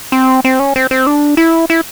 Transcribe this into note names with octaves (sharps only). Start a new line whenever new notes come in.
C4
C4
C#4
C4
C4
D4
E4
E4